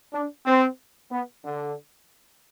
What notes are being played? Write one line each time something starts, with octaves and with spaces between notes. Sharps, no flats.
D4
C4
B3
D3